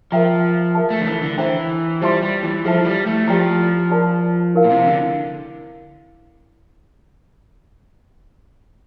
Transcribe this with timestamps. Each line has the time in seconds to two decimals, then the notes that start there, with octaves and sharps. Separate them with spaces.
0.12 F3 A#4 E5 G5 A#5
0.75 A#4 E5 A5
0.90 A3
1.01 D3
1.07 E3
1.22 D3
1.38 E3 C5 E5 G5 A#5
2.01 G3 F4 C5 E5 A5 C6
2.22 G3
2.43 E3
2.64 F3 E4 A4 C5 E5 A5
2.85 G3
3.06 A3
3.28 F3 G4 D5 G5 A#5
3.90 F4 A#4 D5 A5
4.55 E4 A#4 F5
4.65 A#2
4.70 C3
4.86 D3